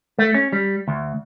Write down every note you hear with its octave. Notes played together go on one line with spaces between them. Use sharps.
A3
C#4
G3
D2